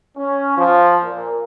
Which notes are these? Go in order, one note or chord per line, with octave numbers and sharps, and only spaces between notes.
C#4
F3
A#2